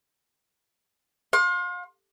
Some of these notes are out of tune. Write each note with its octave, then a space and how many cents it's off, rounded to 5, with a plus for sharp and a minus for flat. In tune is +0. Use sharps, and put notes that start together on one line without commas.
F5 +40 C6 +30